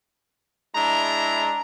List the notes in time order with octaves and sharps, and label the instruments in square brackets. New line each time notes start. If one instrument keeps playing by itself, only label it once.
[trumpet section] G#3 D4 E4 A#5